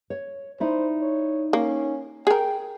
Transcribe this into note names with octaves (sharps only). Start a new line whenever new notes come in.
C#5
D#4 E4 C5 D5
C#5
A#3 C#4
G#4 A#4 G5